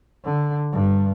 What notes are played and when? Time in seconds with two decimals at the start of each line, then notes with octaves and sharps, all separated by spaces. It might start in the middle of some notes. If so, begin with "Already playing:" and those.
0.25 D3
0.73 G2